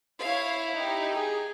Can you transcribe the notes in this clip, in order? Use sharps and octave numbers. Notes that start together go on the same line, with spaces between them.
E4 C#5 F5
D#4 G4
G#4